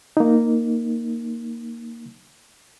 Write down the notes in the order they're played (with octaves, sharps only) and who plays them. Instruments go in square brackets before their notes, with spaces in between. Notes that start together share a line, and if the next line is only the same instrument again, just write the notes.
[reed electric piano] A#3 D#4